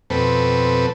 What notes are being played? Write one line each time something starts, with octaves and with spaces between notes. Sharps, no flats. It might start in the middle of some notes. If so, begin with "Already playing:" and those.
F2 B2 C4 A4 B4